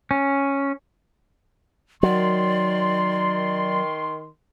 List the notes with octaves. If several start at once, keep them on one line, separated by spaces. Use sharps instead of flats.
C#4
D#3 F#3 D5 C6